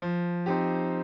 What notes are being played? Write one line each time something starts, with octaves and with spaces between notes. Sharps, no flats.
F3
C4 D#4 G4